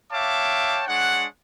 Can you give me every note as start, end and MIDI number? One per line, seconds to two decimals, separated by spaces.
0.11 0.84 73
0.11 0.84 76
0.11 0.84 77
0.11 0.84 79
0.11 0.84 81
0.11 0.84 86
0.88 1.25 56
0.88 1.25 62
0.88 1.25 73
0.88 1.25 78